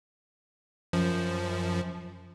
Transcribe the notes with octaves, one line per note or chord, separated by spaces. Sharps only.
F#2 F3